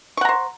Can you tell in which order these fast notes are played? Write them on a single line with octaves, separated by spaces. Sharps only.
C#6 F#5 A#5 C5